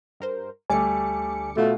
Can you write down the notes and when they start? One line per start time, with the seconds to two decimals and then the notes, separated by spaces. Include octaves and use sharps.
0.20 G2 A#4 C5
0.70 D2 G3 A3 G#5 D6 C#7
1.57 B2 A3 F4